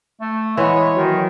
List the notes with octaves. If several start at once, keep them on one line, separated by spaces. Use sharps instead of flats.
A3
E3 G#3 B3 C#5
D#3 F#3